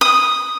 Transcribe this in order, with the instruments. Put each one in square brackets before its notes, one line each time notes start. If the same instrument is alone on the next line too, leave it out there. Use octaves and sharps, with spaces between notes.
[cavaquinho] D#6